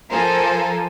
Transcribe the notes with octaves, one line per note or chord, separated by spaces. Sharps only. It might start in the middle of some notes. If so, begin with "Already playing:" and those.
F3 A4 A#4 C5 G#5